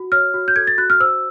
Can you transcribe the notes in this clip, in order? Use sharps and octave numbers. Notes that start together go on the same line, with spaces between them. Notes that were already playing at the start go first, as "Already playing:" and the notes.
Already playing: F#4
C#5 F6
F#4
G6
A4 G#6
A6
F#4 F#6
F6
C5 E6